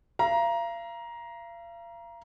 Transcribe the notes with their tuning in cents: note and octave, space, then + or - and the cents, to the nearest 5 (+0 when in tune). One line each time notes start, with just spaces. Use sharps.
F5 -40 A#5 +15